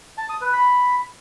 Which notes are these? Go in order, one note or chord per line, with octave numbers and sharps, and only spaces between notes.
A5
D#6
B4
B5